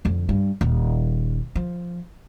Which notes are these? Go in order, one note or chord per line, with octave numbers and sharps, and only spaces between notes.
F2 D3
G2
D#1
F3